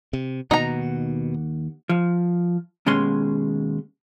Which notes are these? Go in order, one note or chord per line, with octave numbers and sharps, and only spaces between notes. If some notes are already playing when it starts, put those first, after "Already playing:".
C3
D#2 B2 F3 D#4 F#5 A#5
F3
D#2 B2 G#3 C#4 C6